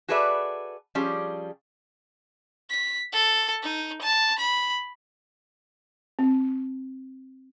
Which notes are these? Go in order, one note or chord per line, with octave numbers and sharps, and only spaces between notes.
F#4 G#4 A4 B4 D5 E5
F3 G3 C#4 G4 G#4
B6
A4
D#4
A5
B5
C4